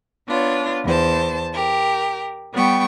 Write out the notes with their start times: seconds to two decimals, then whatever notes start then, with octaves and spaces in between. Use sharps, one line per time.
0.28 B3 D4 F4 C#5
0.84 E2 C5 A5
1.53 G4 A#4
2.53 G3 B3 G5 C#6